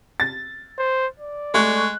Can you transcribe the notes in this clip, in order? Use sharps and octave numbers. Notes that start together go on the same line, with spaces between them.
A6
C5
D5
G#3 A3 C#6 F#6